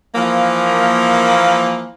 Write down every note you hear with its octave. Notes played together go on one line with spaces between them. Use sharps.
E3 F3 A#3